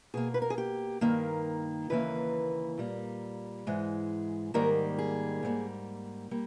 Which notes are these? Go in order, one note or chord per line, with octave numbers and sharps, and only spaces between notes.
B2 A#3 G#4
B4
A#4
G#4
G4
G2 D#3 A#3
D#2 C#3 E3 A#3 B4
A#2 G3 A#3
G#2 E3 G#3
G#2 D#3 G3 A#3 A#4
G#4
G#2 G3 A#3
G3 A#3